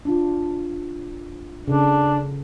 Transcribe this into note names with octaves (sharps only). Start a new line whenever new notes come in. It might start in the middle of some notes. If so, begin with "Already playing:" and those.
D4 F4
C#3 D4 A4